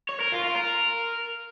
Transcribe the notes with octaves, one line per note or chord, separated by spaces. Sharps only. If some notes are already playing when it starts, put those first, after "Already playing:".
C#5
A#4
F4
F4
A#4